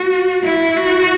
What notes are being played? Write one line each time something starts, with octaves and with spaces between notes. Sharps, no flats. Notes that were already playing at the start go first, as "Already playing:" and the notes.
Already playing: F#4
E4
F#4